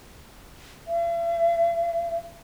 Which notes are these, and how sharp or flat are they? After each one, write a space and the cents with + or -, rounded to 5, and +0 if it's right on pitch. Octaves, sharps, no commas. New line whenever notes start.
E5 +45